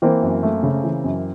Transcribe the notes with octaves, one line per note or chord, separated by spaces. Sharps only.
E3 A#3 C4
F#2
A3
C#3
E3
F#2